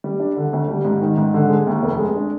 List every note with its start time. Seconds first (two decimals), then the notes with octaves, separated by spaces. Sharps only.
0.04 G3
0.20 D4
0.37 D3
0.53 D2
0.69 G3
0.85 G#2
1.01 D#3
1.17 G#2
1.34 D3
1.50 G#3
1.67 D#2
1.83 F1
1.99 G#3
2.16 D4